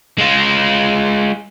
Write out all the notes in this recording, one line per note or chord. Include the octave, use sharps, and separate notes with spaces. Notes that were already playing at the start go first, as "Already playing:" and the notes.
G#3 F4